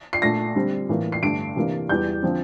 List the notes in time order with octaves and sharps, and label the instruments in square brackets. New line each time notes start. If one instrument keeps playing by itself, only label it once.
[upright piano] C7
A#2 A3 D4 A#6
D3 G3 C4
A2 E3 A#3
C7
G2 D3 A3 D7
C3 E3 A#3 D4
E2 E3 G3 G6
D3 F3 C4